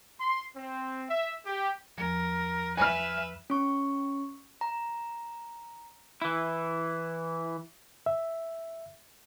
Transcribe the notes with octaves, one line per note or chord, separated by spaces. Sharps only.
C6
C4
E5
G4
E2 F3 A#4
B4 E5 G#5 F6
C#4 C#6
A#5
E3 E4
E5